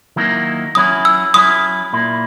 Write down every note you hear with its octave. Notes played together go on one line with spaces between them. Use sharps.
D#3 F#3 A#3 E4
F#3 C#4 E4 D#6
E6
F#3 C#4 E4 D#6
A#2 A#3 E4